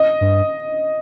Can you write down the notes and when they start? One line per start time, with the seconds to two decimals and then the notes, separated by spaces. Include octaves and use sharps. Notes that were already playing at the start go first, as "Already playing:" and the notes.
Already playing: D#5
0.21 G2